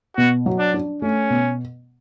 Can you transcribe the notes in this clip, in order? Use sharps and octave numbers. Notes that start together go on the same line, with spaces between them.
B2 F#4
F#3
D4
D4
A3 C#4
B2